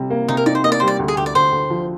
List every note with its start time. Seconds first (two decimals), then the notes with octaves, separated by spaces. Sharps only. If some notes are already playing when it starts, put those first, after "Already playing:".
Already playing: C3 G3
0.10 A#3
0.28 C3 D#4
0.37 A#4
0.46 D#4 D5
0.55 C5
0.64 A#3 D#5
0.72 D5
0.80 G3 C5
0.88 D5
0.99 D2
1.08 G#4
1.17 D2 G4
1.26 D5
1.35 D2 C5
1.52 D2
1.70 F3